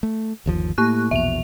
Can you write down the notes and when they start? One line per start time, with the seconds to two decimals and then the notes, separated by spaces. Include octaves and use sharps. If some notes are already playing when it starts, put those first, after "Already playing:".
0.03 A3
0.46 G1 D#2 F3
0.78 A2 A#3 C#6 F#6
1.11 A#1 E2 B2 E5 F7